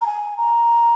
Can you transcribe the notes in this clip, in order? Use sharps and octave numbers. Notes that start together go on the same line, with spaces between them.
A#5
G#5
A#5